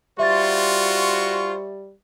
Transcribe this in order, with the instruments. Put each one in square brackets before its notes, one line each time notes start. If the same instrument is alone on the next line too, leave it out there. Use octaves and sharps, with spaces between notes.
[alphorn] G3 [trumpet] F4 [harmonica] F#4 C5 C#6 [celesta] E5 A6